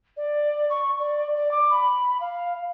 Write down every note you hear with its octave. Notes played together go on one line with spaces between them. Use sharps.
D5
C#6
D5
D5
D6
B5
F5